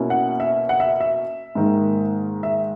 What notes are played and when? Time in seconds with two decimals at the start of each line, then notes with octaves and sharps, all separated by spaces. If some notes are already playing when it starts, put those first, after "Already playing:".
Already playing: B2 A#3 C#4 E4
0.10 F#5
0.40 E5
0.69 F#5
0.80 E5
1.01 E5
1.55 G#2 D#3 A#3
2.43 E5